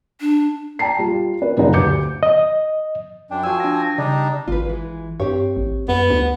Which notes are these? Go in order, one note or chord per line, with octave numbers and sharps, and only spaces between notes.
D4
D5 G5 A5 A#5 C7
G3 F4
B4
F#1 G2 C#3 D#4 B4 F#5
D2 G4 D6 G6 C#7
D#5
F#2 D4 G5
F3 F#4 G#5 E6
D4 G5 A#6
C#3 G3 D4 D#4 D5
G#1 F4 B4
E3 G#3
G2 C4 G4 C#5
A1
F#2 G3 B3
D2